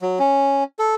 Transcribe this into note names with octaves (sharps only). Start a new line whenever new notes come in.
F#3
C#4
A4